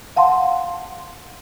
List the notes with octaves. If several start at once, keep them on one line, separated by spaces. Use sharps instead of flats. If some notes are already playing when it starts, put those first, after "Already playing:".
F5 F#5 A5 C6